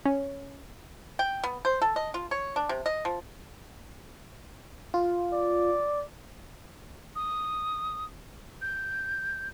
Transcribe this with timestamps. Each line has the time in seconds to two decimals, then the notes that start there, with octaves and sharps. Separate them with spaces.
0.05 C#4
1.19 G5
1.44 B3
1.65 C5
1.82 A4
1.96 D#5
2.14 F4
2.31 C#5
2.56 D4
2.69 C3
2.86 D#5
3.05 F3
4.94 F4
5.33 D5
7.16 D#6
8.61 G6